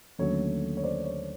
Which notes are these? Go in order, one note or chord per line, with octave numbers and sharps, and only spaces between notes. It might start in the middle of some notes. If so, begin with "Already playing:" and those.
D#2 D3 F#3 A3 C#4 C#5
C#5
C5 D5
C#5